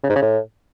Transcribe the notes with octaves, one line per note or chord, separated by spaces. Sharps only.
C#3
G#2
C#3
A2